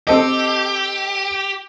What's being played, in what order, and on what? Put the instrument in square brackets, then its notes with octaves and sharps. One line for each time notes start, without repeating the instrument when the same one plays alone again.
[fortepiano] C4 A4 D#5 [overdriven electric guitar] G4